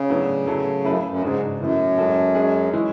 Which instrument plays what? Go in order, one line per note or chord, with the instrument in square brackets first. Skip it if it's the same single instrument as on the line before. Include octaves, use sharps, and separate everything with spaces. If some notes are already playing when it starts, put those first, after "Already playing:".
Already playing: [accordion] C#3
[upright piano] A2 F#3 B3 D4 F#4
F#3 A3 E4 A4
[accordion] F#2 [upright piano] A3 E4 B4
[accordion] F#2
[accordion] G#2 [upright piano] C#3 G#3 D4 F#4
[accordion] F#2 [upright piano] A2 E3 B3
[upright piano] G#3 C#4 F#4 A4
G#3 C#4 G#4
E3 G#3 C#4 E4